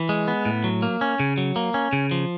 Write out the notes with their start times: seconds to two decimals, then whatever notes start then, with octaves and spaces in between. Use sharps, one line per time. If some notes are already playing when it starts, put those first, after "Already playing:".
Already playing: E3
0.09 G#3
0.28 B3
0.45 A2
0.64 F#3
0.82 A#3
1.01 C#4
1.20 C#3
1.38 F#3
1.56 A#3
1.74 C#4
1.93 C#3
2.11 F3